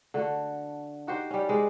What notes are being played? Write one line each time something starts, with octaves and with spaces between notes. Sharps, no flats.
D3 A3 F#4
D#4 F#4 G4 C5
G3 C#4
G#3 B4 C5 D5